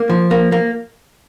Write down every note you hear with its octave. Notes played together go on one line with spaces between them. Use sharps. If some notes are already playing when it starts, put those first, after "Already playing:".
Already playing: A#3
F3
A#3
A#3